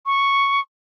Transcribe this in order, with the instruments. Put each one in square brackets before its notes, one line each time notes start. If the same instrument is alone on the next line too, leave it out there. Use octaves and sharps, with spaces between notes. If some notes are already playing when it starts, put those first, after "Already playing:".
[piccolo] C#6